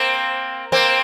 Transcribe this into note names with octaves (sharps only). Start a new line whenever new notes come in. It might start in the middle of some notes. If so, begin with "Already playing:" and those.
Already playing: A#3 C4
A#3 C4